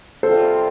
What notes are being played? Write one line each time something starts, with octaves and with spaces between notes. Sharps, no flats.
C3 G3 C4 F4 A4 C5